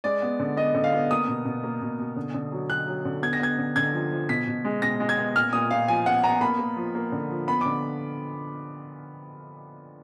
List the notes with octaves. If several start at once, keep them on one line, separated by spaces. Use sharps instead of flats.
G#3 D5
B3
D3
B3 D#5
D3
F5
B3
A#3 D#6
B2
B2
A#3
B2
B2
D3
D3
F#3
F#3 F#6
F#3
D3
B3 G#6
A#6
B3 G#6
D3
D3 G#6
F3
F3
B2 B6
B2
G#3
B2 A#6
G#3
G#6
B3
A#2 F6
A#2 D#6
A#2 F5
F3 G#5
B3 F#5
B3 A#5
A#3 B5
A#3
F3
A#3
D3
F3
B3 B5
D6
D3